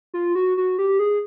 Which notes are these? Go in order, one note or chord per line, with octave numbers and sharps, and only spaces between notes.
F4
F#4
F#4
G4
G#4